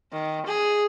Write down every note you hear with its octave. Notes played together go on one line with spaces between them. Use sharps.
D#3
G#4